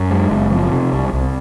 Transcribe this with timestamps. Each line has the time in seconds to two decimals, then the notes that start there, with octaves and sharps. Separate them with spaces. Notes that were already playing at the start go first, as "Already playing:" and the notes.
Already playing: F#2
0.11 G#3
0.31 F#1
0.51 F3
0.71 C3
0.93 C2
1.13 C2